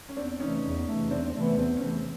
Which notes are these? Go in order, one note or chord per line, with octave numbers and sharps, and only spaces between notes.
C#4
E2 C4 D4
C3 E3 A3 C#4 D#4
E2
C3 E3 A3
E2 C4 D4
C4
C3 E3 A3
B3
E2 C4
C#4
C3 E3 A3 C4